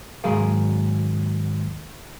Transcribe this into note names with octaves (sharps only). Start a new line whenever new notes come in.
D#2 G#2 F#3 G#4 A#4 F5